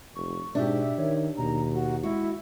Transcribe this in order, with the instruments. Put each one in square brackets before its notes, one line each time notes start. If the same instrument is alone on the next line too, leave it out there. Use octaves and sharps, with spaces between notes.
[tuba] F1 [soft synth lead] C#6
[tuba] G#2 [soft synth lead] B2 [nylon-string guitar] D4 G4 [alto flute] E5
[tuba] D#3 [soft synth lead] C#5
[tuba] D#2 [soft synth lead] B2 [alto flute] A#5
[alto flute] F#4
[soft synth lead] G#3 [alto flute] E4 [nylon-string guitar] F#4